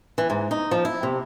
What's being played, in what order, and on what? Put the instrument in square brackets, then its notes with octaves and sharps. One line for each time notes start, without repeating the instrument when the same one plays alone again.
[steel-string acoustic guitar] E3
G#2
D#4
F3
E4
C3